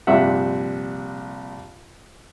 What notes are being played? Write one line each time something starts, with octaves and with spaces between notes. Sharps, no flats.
A#1 G2 C3 E5 F#5